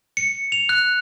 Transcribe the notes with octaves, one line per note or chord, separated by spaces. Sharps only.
C#7
F7
F#6